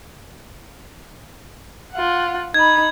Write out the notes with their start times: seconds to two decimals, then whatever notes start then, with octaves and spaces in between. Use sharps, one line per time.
1.92 F4 F#5
2.54 D#4 B5 G#6